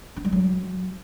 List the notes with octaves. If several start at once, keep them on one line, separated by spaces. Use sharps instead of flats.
D4
G3
F#3